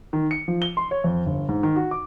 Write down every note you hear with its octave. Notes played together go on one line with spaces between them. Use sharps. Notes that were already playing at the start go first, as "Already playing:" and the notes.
D#3
C#7
F3
G7
C6
C#5
F2
G1
G#2
D#3
F#4
D6